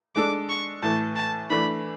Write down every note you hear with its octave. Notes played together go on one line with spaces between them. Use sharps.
G#3 D4 A4 D6
C#6
A2 E3 A3 A5
A5
E3 A3 D4 B5